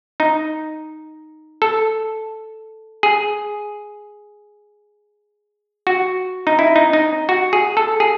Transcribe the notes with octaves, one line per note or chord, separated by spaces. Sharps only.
D#4
A4
G#4
F#4
D#4
E4
D#4
D#4
F#4
G#4
A4
G#4